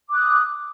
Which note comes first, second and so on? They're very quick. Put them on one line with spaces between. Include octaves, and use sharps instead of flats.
D6 F#6 D#6